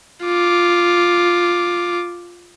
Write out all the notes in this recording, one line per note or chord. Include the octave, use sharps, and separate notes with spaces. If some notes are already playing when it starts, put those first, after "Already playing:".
F4 D6